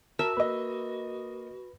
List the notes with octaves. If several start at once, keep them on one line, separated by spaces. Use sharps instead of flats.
F#4 A#4 E5 A5
A#3 B4 D#5 B5